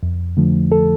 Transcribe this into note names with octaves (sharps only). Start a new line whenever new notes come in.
F2
D3 F3 A3
A4